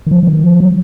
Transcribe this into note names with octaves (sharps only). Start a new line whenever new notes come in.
D#3
F3
F3
D#3
F3
F#3